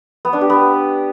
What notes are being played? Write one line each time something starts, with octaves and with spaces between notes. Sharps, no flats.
B3
D4
G4
B3